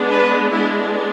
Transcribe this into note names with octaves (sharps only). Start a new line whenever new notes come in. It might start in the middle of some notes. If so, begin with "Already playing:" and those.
Already playing: G#3 B3 D4
B4
G#3 B3 D4 E4